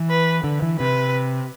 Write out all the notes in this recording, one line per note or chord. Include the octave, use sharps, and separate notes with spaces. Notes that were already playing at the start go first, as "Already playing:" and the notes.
Already playing: E3
B4
D3
E3
C3 B4